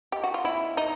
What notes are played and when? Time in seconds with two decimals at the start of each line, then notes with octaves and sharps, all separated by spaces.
0.12 G4 D#5
0.24 F#4
0.34 F4
0.45 E4 E5
0.77 D#4 D#5